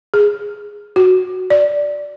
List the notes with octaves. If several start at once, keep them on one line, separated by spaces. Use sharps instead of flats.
G#4
F#4
D5